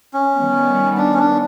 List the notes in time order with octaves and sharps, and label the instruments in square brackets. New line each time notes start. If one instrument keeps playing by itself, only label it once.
[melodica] C#4
[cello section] D#3 G3 B3
[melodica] D4
C#4
D4